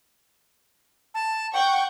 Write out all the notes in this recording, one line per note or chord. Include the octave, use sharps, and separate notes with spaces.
A5
F#5 G5 C#6 G6